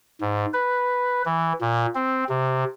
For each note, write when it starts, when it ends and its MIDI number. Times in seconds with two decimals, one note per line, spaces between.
0.21 0.46 44
0.53 1.22 71
1.26 1.53 52
1.61 1.86 46
1.95 2.24 60
2.29 2.64 48